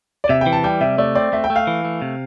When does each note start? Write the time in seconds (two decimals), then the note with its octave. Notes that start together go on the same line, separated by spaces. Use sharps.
0.24 D5
0.29 C3 E5
0.41 G5
0.46 E3
0.52 A5
0.64 G3 G5
0.81 C3 E5
0.98 A3 D5
1.15 C4 D5
1.33 A3 E5
1.44 G5
1.50 A3
1.56 F5
1.67 E3
1.85 A3
2.02 C3